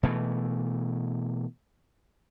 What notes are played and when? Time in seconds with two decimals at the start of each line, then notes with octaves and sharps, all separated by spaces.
0.03 B2 E3 A3